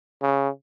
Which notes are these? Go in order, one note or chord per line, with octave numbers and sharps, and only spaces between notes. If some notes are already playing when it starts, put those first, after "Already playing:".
C#3